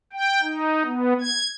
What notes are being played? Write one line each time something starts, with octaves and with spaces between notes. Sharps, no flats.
G5
D#4
B3
G#6